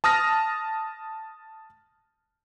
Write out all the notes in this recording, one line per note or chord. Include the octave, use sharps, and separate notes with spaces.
A5 D#6 F6 A#6